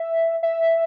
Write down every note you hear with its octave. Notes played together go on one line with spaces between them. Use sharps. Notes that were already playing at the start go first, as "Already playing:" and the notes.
Already playing: E5
E5